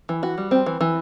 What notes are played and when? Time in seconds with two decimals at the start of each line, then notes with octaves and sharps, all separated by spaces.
0.09 E3
0.23 F#4
0.38 G3
0.51 C4
0.66 E3
0.81 E3